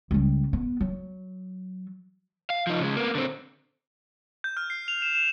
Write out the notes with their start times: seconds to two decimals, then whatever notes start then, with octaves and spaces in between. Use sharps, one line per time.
0.11 C#2 G3
0.53 B3
0.81 F#3
2.50 F5
2.67 F3 D#4
2.80 C#3 G#3
2.96 A#3 B3
3.15 D3 C4
4.44 G6
4.57 F6
4.70 C7
4.88 F7
5.02 E7
5.15 E7